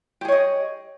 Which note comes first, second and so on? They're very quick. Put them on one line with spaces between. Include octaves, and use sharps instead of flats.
G4 G#4 C#5 D#5